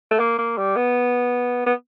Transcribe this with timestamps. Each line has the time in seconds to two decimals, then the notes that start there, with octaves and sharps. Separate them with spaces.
0.11 A3
0.19 A#3
0.38 A#3
0.58 G3
0.76 B3
1.66 B3